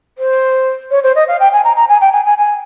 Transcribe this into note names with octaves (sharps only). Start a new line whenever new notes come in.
C5
C#5
C5
D#5
F5
G5
G#5
A#5
A#5
G#5
G5
G#5
G#5
G#5